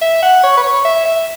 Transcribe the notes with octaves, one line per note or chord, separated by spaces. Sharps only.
E5
F#5
C#5
B4
C#5
E5
E5